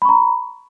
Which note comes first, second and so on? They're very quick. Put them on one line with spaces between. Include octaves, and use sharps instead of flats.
B5 C#6 A#5